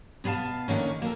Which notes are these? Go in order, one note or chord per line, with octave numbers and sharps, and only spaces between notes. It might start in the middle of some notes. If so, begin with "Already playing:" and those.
B2 B3 A4 F5 A5
D3 D#3 A#3 C#4
A#3 G#4 A4